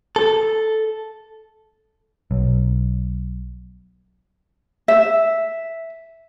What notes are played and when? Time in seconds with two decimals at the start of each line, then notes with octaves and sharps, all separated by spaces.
0.16 A4
2.31 B1
4.88 E5